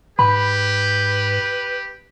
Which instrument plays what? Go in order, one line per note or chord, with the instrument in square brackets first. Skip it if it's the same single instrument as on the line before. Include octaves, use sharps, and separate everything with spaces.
[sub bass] G#2 [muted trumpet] G4 [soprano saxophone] B4 [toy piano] B5